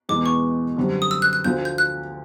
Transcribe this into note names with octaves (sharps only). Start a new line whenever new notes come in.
E2 B2 G#3 B3 D#4 D6
C#6
F#2 D3 G3 C4
D#6
E6
F#6
F#6
D2 D3 F3 G6
G6
F#6